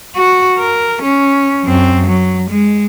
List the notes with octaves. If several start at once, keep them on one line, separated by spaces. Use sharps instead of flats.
F#4
A#4
C#4
F#2 C4
F#3
G#3